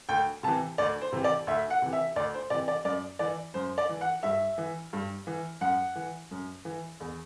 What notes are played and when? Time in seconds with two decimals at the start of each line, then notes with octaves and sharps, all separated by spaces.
0.09 D2 G5
0.43 C3 E3 A5
0.78 D2 D5
1.01 C5
1.12 C3 E3
1.24 D5
1.47 D2 E5
1.70 F#5
1.82 C3 E3
1.93 E5
2.16 D2 D5
2.34 C5
2.50 C3 E3 D5
2.68 D5
2.85 F#2 D5
3.19 E3 D5
3.54 F#2 C5
3.78 D5
3.89 E3
4.01 F#5
4.23 G2 E5
4.58 E3
4.93 G2
5.27 E3
5.61 F#2 F#5
5.95 E3
6.31 F#2
6.65 E3
7.00 E2